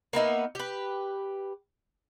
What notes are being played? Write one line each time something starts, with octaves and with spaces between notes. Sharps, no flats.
A#3 B3 D#4 E5
G4 B4